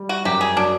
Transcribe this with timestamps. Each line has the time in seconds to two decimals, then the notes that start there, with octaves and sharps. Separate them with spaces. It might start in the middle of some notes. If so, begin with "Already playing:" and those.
Already playing: G3
0.09 F#4
0.25 F#2 G4
0.41 G#4
0.56 F#3 D4